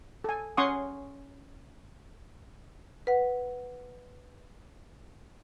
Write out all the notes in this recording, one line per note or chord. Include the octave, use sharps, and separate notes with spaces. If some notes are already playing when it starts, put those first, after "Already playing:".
A4 G#5
C#4 F#5 G#5 C6 C#6 D#6
B4 F#5